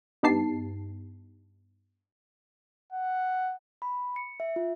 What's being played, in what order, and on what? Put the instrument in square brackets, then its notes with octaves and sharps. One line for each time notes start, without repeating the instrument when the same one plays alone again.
[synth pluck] G2 B3 D#4 G4 A5 C7
[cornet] F#5
[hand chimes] B5
C#7
E5
F4